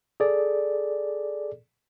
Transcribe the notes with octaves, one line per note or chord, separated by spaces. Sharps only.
G#4 A4 D5